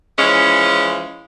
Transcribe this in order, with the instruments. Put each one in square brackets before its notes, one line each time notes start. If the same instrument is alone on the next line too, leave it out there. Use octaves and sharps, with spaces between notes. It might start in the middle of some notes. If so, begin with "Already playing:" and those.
[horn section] E3 F3 G#3 C#4